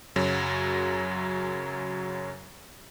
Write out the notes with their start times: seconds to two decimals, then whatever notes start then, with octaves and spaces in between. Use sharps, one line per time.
0.16 F#2 C#3 F#3